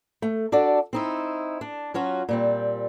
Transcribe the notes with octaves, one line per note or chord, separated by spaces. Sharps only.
A3
D4 F#4 A4 D5
C4 D#4 E4
D4
F#3 C#4 F4 F#4
A#2 G3 C4